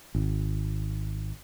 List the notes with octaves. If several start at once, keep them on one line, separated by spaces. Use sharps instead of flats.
G#1